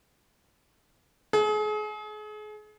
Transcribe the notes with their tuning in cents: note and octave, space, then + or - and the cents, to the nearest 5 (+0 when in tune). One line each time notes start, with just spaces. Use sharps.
G#4 +35